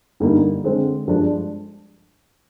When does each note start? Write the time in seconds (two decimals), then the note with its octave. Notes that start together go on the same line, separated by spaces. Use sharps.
0.20 G2 D3 G3 A#3 D#4
0.64 D3 G#3 C4
1.07 G2 F3 G#3 D4